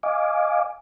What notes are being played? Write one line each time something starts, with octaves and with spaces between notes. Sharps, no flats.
D#5 F5 G#5 D6